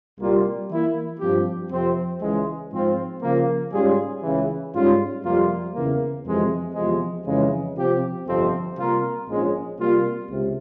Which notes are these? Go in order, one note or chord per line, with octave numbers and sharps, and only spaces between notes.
C2 A#2 G3 A#3 F4
E3 A#3 E4
G2 F3 C4 G4
F2 C3 F3 C4
C#2 C#3 E3 G#3
G#2 F3 C4 F4
C#3 F3 A#3
G#2 G3 C#4 F4 G#4
C#2 C#3 E3
G#2 G3 C#4 F4
F2 C3 G3 A#3 F4
E2 C#3 E3 A#3
F2 C3 E3 G#3 C4
E2 C3 F3 G#3
F2 C#3 E3 G#3
C3 F3 C4 G4
G1 F2 C3 F3 C4
C3 G3 A#3 F4 A#4
A#1 G#2 F3 G#3 C#4
C3 G3 A#3 F4
C#2 C3